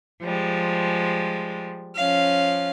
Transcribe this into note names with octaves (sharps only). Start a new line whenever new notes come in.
F3 G3 G#3
F3 C#4 F5